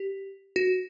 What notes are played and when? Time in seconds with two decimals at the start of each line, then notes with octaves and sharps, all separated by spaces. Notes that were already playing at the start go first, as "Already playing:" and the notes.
Already playing: G4
0.56 F#4